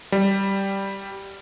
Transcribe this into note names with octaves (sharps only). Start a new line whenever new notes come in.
G3